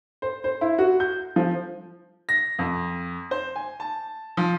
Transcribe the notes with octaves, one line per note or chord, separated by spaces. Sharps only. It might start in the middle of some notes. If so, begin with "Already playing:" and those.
C5
C5
E4
F#4
G6
F3
A#6
F2
C5
G#5
A5
F3